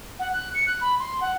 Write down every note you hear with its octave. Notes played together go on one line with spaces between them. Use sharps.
F#5
F#6
C#7
F#6
B5
C6
F#5